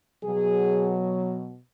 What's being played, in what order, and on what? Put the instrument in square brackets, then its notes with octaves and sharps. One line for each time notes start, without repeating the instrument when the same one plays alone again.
[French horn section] B2 F#3 G#4